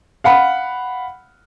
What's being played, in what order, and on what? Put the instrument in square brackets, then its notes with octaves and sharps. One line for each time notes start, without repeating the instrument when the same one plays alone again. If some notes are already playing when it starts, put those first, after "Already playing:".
[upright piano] F5 F#5 B5